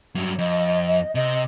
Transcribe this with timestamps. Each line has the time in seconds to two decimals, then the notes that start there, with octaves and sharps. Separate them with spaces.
0.15 G2 F#3
0.39 F2 D#5
1.15 C3 D#5